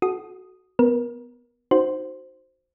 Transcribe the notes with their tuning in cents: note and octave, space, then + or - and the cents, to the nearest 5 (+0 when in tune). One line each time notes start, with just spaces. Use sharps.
F#4 +0 A4 -40 D#6 +0
B3 +5 A#4 +30
D#4 +0 F#4 +0 C5 +0